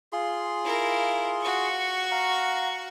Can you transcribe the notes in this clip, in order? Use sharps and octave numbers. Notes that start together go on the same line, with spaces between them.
F4 G#4 C6
E4 A#4
F#4 C#6
F5 F#5 A#5